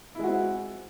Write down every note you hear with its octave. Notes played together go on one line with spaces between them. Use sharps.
G#3 C4 E4 F#4